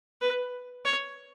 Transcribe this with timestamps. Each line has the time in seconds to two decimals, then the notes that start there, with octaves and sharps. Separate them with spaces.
0.21 B4
0.85 C#5